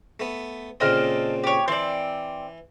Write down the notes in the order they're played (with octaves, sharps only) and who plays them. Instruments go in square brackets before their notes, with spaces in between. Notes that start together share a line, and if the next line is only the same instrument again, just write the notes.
[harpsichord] A3 B3
[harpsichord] A#2 C#3 C4 [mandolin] A4 D#5 F6
[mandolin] G4 C#5
[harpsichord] E3 [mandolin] C4 D5